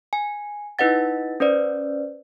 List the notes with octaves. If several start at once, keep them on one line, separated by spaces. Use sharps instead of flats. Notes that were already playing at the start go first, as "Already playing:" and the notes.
G#5
D#4 E4 B4 D#5 F#5 A6
C#4 B4 C5 D5